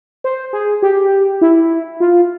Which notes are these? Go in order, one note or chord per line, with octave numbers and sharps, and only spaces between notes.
C5
G#4
G4
E4
F4